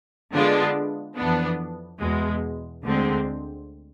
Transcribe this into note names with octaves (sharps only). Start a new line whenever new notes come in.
D3 G#3 B3 D4 F4
F2 E3 B3 D4
E2 B2 G#3
D2 D3 G#3 C4